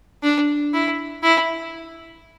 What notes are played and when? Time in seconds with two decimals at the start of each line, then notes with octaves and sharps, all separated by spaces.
0.23 D4
0.74 E4
1.23 E4